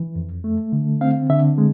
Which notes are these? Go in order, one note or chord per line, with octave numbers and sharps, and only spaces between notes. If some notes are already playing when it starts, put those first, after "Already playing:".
Already playing: E3
F2
A3
D3
C4 F5
D3 E5
G#3